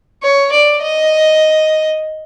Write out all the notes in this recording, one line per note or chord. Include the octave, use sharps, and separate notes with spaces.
C#5
D5
D#5